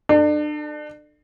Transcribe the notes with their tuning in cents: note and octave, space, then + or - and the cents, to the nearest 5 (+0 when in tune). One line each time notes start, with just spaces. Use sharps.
D4 +35 A4 +0